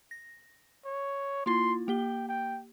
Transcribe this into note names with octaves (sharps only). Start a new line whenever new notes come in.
A#6
C#5
A#3 E4 F4 C6
A#3 G4 G5 G7
G5